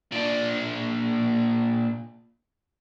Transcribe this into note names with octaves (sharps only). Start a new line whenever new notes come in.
A#2 D4